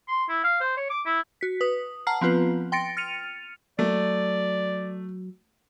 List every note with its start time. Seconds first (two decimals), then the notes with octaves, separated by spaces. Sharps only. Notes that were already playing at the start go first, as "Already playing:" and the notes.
0.08 C6
0.29 E4
0.44 F5
0.61 C5
0.77 C#5
0.90 D6
1.06 E4
1.41 F#4 B6
1.61 B4 D#6
2.07 F#5 A5 A#5 F6 C7
2.21 F3 B3 C4 F4 B4
2.72 G5 C6 A6 A#6 C#7 D7
2.97 F6 A6 C#7 D#7 F7
3.79 F#3 A3 D5